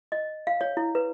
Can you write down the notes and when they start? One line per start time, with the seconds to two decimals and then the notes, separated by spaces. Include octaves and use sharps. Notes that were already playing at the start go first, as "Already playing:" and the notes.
0.12 D#5
0.47 F5
0.61 C#5
0.77 E4
0.95 B4